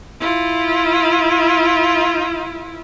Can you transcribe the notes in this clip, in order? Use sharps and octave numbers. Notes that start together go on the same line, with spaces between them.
E4 F4